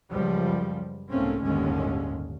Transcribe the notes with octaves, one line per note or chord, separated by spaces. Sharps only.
C#2 F#2 F3 G3
C2 G#2 A3 A#3 C4 C#4
G1 D#2 A2 D3 G#3 C#4